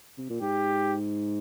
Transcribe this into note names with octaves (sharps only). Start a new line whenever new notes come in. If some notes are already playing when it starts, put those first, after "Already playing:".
C3
A#2
G#2 G4